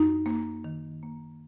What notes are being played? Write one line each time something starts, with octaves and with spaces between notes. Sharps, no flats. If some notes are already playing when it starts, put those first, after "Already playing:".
Already playing: F#2 D#4
A#3
D#3
A#3